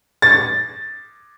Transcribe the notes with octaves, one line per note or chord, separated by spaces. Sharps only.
A6